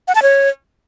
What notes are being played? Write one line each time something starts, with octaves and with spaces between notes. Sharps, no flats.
F#5
A5
C#5